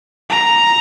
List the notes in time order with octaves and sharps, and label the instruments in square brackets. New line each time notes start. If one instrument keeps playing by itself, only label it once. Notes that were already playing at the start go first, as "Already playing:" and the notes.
[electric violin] A#5